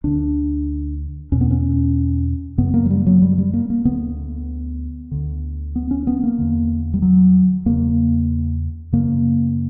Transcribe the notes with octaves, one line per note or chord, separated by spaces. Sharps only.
D2 D3 D4
E2 B2 C#4
B3
C#4
F#2 C#3 B3
A#3
F#3
G3
F#3
G3
G3
A#3
A#3
D2 D3 B3
D2 D3
B3
C#4
B3
A#3
E2 D3
G3
F#3
E2 C#3 A#3
F#2 C#3 A#3